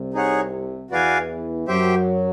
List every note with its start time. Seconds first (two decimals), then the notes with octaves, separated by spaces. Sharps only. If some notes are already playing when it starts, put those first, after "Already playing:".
Already playing: C2 C3
0.14 D#4 G#4 C#5 F#5
0.91 E2 E3 F#4 B4 D5 F5 G#5
1.68 F#2 F#3 G4 C5 E5 G5